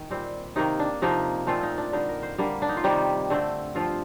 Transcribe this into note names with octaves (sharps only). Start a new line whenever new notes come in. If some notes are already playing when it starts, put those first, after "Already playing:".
Already playing: D#3
A#2 G3 C4
C3 D#3 A#3 D#4
D4
C3 F3 A#3 D#4
A#2 F3 A3 C4 F4
D#4
D4
D3 G3 A#3 D#4
A#4
C5
D3 G3 A#3
D4
D#4
F4
C3 D#3 G3 A#3 G4
D3 A3 C4
G2 F3 C4 F4